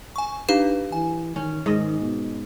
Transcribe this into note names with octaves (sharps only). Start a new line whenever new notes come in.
G#5 C#6
D4 D#4 G4 B4 F5
E3 G#5
D#3 C#4
G#2 D#3 D#5
B2